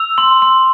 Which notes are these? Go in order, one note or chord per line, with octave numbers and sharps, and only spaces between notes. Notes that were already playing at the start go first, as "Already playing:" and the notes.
Already playing: E6 F7
C6
C6